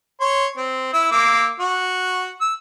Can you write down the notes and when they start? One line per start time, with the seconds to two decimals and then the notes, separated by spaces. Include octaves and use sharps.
0.20 C#5 C6
0.57 C4
0.93 E4 E6
1.11 A#3 D6 E6
1.59 F#4
2.41 E6